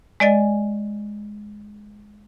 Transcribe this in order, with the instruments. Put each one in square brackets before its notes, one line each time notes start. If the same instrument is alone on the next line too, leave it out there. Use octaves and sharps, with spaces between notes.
[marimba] G#3 D5 D#5 G#5 A6